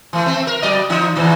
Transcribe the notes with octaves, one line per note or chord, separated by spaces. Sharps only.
E3 A3
A3 C4
A#4
F#3 D5 D#5
E3 D#4
E2 A2 D#3